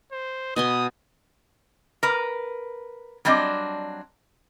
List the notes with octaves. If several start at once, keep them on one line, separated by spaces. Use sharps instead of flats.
C5
B2 G#5 C6 D#6
A#4 B4
F#3 G3 C4 D4 D#5